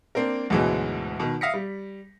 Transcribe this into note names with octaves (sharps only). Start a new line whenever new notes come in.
A#3 C4 D4 A#4
D2 G#2 B2 E3 F#3 G#3
B2 D#3
E5 F5 D#6 A#6 B6 C#7
G3